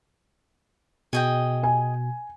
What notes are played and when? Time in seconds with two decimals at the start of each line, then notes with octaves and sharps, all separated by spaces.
1.13 B2 G#4 D#5 G5
1.63 G#5